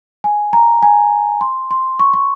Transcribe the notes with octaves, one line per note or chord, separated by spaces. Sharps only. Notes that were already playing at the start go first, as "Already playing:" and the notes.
G#5
A#5
G#5
C6
C6
C#6
C#6